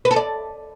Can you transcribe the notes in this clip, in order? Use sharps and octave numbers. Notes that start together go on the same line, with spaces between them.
B4
A4
D5